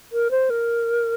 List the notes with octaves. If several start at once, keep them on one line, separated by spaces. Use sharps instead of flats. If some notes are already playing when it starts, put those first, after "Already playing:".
A#4
C5
A#4